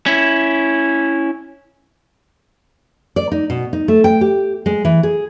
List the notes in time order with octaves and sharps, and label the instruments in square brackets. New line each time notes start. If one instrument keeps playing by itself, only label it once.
[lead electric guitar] C#4 E4
[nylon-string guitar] D5
D#4
B2
D#4
A3
G5
G4
G#3
E3
G#4